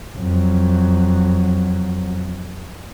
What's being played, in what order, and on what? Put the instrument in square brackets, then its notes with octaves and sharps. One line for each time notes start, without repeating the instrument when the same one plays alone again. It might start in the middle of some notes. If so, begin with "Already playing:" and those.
[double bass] F2 F#3